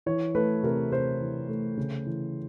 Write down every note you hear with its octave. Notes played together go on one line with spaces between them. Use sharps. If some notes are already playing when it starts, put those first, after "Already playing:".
E3 C#5
A3 B4
C3 A#4
C3 C5
E3
A3
C#3
E3